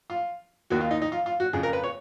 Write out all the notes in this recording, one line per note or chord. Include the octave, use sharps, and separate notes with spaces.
F4
D#2 D#3 F#4
F4
D#4
D#4
F4
F4
F#4
F2 C#3 G#4
A#4
B4
C#5